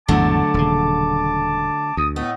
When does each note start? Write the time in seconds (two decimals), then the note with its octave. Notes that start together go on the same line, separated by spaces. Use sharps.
0.08 G#1 E2 D3 F#3 A3 A5 D6
0.54 D#1 C#3
1.97 D2 D#6
2.16 A2 A3 B3 D#5